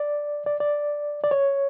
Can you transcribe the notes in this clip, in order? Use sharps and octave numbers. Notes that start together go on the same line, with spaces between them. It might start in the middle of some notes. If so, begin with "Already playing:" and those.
Already playing: D5
D5
D5
D5
C#5